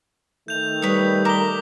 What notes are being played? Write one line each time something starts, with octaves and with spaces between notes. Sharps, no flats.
D#3 A3 G6 F7
G3 B4 C#5 D#6
A#4 D6 B6 G7